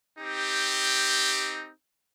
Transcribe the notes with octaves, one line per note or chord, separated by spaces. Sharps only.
C4 D#4 G4